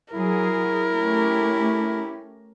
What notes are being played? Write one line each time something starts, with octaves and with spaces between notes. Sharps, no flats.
F#3 E4 G#4 A#4
A3 C#4 G4